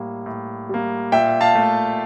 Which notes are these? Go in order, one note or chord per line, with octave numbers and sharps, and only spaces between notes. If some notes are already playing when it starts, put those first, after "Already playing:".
Already playing: A2 G3 A#3
A2
G3 A#3
A#2 E5 G5
F5 A5
A3